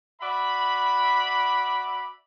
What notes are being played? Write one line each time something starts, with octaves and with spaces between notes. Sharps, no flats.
F#4 D5 E5 B5